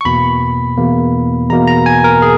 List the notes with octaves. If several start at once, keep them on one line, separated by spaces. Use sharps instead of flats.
C#6
E2 B2 A#3 B5
E2 B2 A#3
E2 B2 A#3 A#5
A#5
G#5
A#4
G#4